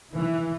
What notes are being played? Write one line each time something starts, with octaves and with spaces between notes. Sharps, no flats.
E3